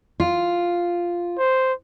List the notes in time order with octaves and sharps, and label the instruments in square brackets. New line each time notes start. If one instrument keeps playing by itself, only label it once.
[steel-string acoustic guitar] F4
[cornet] C5